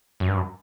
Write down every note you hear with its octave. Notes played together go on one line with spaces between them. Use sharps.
F#2
G2
F#2